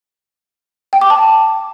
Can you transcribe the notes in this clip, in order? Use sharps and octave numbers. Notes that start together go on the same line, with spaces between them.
G5
D6
A5